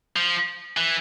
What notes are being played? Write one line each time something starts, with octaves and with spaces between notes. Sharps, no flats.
F3
E3